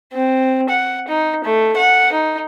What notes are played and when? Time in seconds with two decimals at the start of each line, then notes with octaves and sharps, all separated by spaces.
0.13 C4
0.69 F#5
1.08 D#4
1.44 A3
1.76 F#5
2.13 D#4